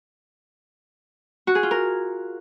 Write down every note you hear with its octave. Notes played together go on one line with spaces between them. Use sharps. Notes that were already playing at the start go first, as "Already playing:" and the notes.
F#4
G#4
F4
A#4